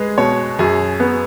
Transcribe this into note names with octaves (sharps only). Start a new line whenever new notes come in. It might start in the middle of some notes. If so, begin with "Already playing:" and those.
Already playing: G#3 G#4 B4
B2 C#5
F#2 G#4
B3